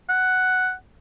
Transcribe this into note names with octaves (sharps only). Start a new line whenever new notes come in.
F#5